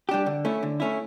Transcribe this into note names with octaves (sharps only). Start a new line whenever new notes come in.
G3 D4 G4
D3
A3 C#4 E4
D3
A3 C#4 E4